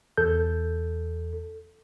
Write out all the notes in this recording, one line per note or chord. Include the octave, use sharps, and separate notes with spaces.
E2 A4 G6